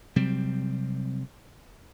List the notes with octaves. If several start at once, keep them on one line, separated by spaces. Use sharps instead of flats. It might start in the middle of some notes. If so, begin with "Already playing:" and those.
C3 F#3 G3 C4